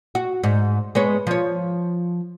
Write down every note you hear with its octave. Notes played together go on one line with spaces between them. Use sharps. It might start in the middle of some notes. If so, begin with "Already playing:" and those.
F#4
G#2
G#3 B3 C#5
F3 C#5